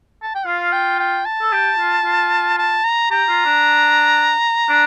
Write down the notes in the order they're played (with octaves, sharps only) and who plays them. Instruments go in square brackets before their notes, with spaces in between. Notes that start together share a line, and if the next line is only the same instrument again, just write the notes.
[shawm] A5
G5
[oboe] F4 [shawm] F5
[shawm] G5
G5
A5
[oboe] A4
G4
F4
F4
[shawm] A5
A#5
[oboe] G4 [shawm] A#5
[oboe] F4
D4
D4